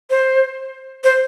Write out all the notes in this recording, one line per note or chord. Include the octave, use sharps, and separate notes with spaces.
C5
C5